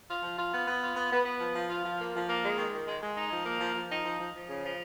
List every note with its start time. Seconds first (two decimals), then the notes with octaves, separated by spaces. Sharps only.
0.09 F4
0.23 F3
0.38 F4
0.52 B3
0.67 B3
0.82 F4
0.96 B3
1.12 B3
1.25 B3
1.40 F3
1.55 F3
1.70 F4
1.85 F3
1.99 A#3
2.15 F3
2.28 A#3
2.43 G#3
2.58 D#3
2.73 D#3
2.88 G#3
3.03 G#3
3.17 D#4
3.32 F3
3.46 A#3
3.60 F3
3.75 F3
3.90 D#4
4.05 F3
4.20 F3
4.34 F3
4.49 C#3
4.64 F3